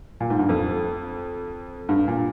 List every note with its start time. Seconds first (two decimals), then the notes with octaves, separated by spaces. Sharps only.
0.20 A#2
0.30 G#2
0.39 G2
0.49 F2
1.89 G2
2.08 A#2